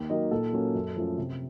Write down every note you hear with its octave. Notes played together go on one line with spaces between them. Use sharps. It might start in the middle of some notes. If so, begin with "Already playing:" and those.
Already playing: D#2
D#3 F#3 A#3 D#4 D#5
A#2 A4
F#3 A#3 C#4
F#2
F3 A3 C#4
C3